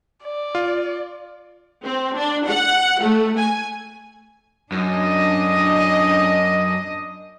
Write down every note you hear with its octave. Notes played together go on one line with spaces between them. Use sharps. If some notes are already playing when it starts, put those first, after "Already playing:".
D5
F4
C4
D4
F#5
A3
G#5
F#2 D4 D#5